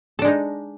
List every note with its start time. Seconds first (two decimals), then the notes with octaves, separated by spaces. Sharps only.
0.19 A4
0.22 D4
0.25 G#3
0.28 D#4